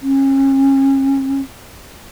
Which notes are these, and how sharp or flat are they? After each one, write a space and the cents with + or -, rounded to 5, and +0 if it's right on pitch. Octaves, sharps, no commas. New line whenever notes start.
C#4 -35